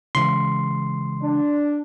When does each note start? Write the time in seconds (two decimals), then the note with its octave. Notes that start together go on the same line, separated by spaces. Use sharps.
0.15 C#3 E3 G#3 C6
1.22 D4